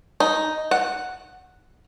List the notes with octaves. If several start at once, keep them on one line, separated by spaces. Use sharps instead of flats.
D#4
F#5